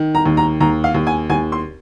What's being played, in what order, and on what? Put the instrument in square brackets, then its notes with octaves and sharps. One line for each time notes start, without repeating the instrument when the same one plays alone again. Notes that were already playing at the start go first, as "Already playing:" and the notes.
Already playing: [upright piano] D#3
A#5
D#2
A#5
D#2 A#5
F5
D#2
G#5
D#2 G#5
C6